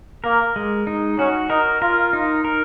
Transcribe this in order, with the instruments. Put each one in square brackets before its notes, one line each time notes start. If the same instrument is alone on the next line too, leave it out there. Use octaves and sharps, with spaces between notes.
[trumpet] A#3 [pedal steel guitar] A#4
[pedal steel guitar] G#3
D#4
[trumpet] C#4 [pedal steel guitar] F#4
[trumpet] D#4 [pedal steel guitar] A#4
[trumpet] F4 [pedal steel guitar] A#4
[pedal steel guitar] D#4
A#4